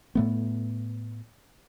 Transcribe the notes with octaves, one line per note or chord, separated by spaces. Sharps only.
A2 A3 B3